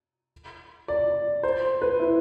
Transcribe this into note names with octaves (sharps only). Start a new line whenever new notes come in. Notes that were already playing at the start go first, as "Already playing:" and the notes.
D5
C5
B4
E4